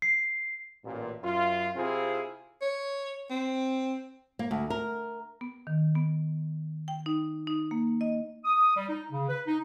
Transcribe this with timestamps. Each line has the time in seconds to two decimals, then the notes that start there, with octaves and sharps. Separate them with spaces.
0.02 C7
0.84 A1 A#2
1.23 F#2 F4
1.75 C3 C4 E4 F4 G#4
2.61 C#5
3.30 C4
4.39 A#3
4.51 D2
4.70 A#4
5.41 B3
5.67 D#3
5.95 B3
6.88 G5
7.06 D#4
7.47 D#4
7.71 A#3
8.01 D#5
8.45 D#6
8.76 G3
8.89 D#4
9.11 C#3
9.28 B4
9.47 D#4